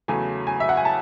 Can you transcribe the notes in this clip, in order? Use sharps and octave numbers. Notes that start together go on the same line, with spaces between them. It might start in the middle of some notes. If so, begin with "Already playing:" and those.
E2 C#3 F#3 A3 G#5
G#5
E5
F#5
G#5
A5